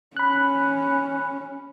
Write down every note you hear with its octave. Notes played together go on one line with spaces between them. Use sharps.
C#4 B5 F#6